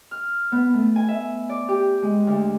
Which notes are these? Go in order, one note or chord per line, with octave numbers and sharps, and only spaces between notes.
F6
B3
A3
G#5
E5
D5
G4
G#3
D2